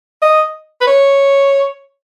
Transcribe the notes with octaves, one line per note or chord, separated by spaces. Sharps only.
D#5
B4
C#5